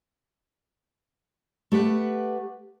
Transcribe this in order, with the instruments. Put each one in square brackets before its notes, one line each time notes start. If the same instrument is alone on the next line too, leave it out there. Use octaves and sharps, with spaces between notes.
[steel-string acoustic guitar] A3 G4 B4 F#5